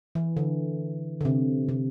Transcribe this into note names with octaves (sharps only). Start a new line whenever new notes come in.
E3
D3
D3
C3
C3